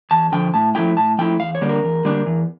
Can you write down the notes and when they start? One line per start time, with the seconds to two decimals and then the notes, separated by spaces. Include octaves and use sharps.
0.11 E2 A5
0.32 D3 F3 G5
0.54 A2 A5
0.75 F3 A3 E4 G5
0.97 A2 A5
1.18 F3 A3 E4 G5
1.40 E2 F5
1.55 C#5
1.61 D3 G3 A#3 D4
1.69 A#4
1.83 E2
2.05 D3 G3 A#3 D4
2.26 E2